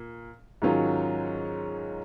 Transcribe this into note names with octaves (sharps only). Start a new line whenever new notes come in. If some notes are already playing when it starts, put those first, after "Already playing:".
Already playing: A#2
G#2 D#3 F#3 C#4 F4